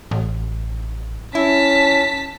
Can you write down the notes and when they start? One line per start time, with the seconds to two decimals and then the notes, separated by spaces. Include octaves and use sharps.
0.11 A1
1.35 C#4 E4 A5 B6